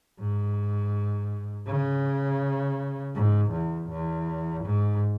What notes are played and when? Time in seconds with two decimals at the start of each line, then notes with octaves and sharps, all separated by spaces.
0.20 G#2
1.67 C#3
3.15 G#2
3.52 E2
3.89 E2
4.64 G#2